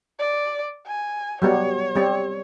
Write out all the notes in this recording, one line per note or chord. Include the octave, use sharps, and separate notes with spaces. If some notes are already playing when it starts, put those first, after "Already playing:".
D5
G#5
F#3 G3 B3 C#5
G3 C4